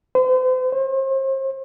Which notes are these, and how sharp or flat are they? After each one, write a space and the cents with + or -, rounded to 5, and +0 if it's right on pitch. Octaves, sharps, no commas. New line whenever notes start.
C5 -40
C5 +40